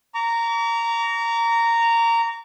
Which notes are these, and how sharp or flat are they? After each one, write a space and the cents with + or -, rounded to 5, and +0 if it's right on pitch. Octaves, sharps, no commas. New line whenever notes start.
A#5 -10 D6 -45